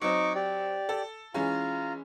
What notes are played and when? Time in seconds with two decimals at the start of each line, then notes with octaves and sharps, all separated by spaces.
0.01 F#3 C4 D#4 C#6 D6
0.35 G4 D5
0.89 A4
1.34 E3 G#3 C#4 F4 A#5